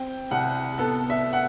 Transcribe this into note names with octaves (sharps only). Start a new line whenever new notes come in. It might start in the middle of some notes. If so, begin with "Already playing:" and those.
Already playing: C4 G5
C2 F#5
B3 A4
E5
F#5